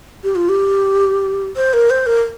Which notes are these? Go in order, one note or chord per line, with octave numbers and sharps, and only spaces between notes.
G4
F4
G4
C5
A#4
C5
A#4